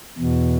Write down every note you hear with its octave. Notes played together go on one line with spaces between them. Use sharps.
E2 B2